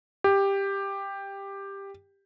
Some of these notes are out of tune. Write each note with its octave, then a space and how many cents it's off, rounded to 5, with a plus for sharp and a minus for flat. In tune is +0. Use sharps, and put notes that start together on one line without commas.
G4 +10